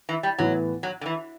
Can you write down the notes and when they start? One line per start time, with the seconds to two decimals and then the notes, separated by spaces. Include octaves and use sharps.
0.09 E3
0.23 G3
0.38 A2 E3 F#3 B3
0.83 F#3
1.01 D3
1.06 E3